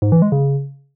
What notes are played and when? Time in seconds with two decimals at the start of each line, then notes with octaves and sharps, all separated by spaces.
0.02 G#2
0.12 E3
0.22 G#3
0.32 C#3